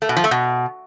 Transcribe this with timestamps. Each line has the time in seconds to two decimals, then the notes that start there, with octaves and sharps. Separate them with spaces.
0.02 A3
0.09 B2
0.17 F3
0.24 A3
0.31 B2